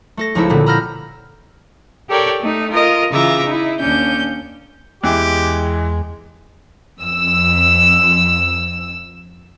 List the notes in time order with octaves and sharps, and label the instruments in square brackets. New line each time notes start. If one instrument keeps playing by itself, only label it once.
[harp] A3 A4 A#6
C#2 F3 C#4 D#4 E4 E6
A#2 D3 B3 C4
A#5 B5 E6 F6 G6 A#6
[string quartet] G4 A4 A#4 C#5 D5 G5
A3 D#4
F4 A#4 D#5
C#3 E3 F4 E5 A#5 D6
D#4 E4
D#2 C#4 D4 G6
[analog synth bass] E2 [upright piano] E3 [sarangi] G#3 [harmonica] G4
[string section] F2 E6